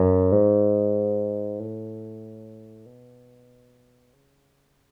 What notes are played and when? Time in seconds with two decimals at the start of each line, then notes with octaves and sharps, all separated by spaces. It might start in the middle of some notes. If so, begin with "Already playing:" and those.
Already playing: F#2
0.32 G#2
1.59 A2
2.86 B2
4.13 C#3